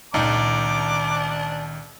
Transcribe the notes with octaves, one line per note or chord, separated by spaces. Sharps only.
C#2 A#2 D#3 D4 D#4 A#5 D6